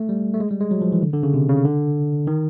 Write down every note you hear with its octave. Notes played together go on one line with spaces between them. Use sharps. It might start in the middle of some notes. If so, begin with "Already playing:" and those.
Already playing: A3
G3
A3
G#3
G3
G#3
F#3
F3
E3
D3
D3
C#3
C3
C#3
D3
D#3